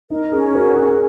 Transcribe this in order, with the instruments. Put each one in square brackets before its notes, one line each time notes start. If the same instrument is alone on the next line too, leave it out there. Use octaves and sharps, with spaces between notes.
[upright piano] D#4 [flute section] A#4
[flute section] C#4 [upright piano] G#4
[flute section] F#4 [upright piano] A#4
[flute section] C#4 [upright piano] G#4